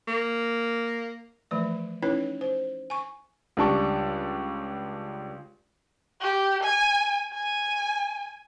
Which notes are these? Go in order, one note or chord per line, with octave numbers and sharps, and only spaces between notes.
A#3
E3 F3 A3 D5
C#4 D#4 E4 B4 C#5
C5
G#5 C#6
C#2 G3 D4 A5 C#6
G4
G#5
G#5